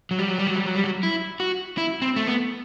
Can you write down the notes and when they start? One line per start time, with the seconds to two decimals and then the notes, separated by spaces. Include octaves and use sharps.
0.11 F#3
0.19 G3
0.29 F#3
0.38 G3
0.47 F#3
0.56 G3
0.66 F#3
0.75 G3
0.84 F#3
1.03 E4
1.40 F#4
1.78 E4
2.02 C4
2.16 A3
2.27 B3